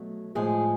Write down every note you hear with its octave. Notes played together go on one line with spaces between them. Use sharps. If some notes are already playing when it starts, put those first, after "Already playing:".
Already playing: B2 F#3 A3
A2 F3 G#3 G#4